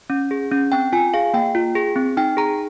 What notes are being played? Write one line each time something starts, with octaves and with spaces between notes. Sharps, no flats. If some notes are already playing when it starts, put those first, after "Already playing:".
C#4
G#4
C#4
C4 G5
F4 G#5
G#4 F5
A#3 G5
F4
G#4
C4
D#4 G5
G#4 A#5